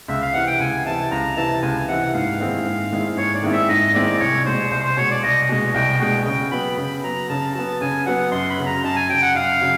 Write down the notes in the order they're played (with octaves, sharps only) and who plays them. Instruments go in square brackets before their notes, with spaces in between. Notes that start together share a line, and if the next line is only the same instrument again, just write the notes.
[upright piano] C#2 [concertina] E5
[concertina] F5
[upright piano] C3 E3 [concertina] F#5
[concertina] G5
[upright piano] C#2 [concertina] G#5
[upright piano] C3 E3 [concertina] A5
[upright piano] C#2 [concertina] A#5
[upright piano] C3 E3 [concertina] A5
[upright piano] C#2 [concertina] G#5
[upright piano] C3 E3 [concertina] F#5
[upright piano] G#2 [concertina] F5
[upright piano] D#3 G#3 C4 E4
G#2
D#3 G#3 C4 E4
[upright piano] G#2 [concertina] C#5
[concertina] D5
[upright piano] D#3 G#3 C4 E4
[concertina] E5
[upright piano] G#2 [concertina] D#5
[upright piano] D#3 G#3 C4 E4 [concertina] D5
[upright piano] C2 [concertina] C#5
[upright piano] B2 G#3 [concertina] C5
[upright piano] C2 [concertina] C5
[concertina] C5
[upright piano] B2 G#3 [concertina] C#5
[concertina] D5
[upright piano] C2 [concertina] D#5
[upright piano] B2 G#3
[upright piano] C2 [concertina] G5
[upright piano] B2 G#3 [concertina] G5
[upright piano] C#3 [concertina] G5
[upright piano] F#3 B3 [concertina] B5
[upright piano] C#3 [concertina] B5
[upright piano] F#3 B3 [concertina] A#5
[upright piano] C#3 [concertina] A5
[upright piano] F#3 B3 [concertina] A5
[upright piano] C#3 [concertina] G#5
[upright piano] F#3 B3 [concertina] F#5
[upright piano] F#2 [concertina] C6
[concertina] B5
[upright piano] C#3 F#3
[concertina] A#5
[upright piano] F#2 [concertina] A5
[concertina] G#5
[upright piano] C#3 F#3 [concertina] G5
[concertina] F#5
[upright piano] F#2 [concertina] F5
[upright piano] C#3 F#3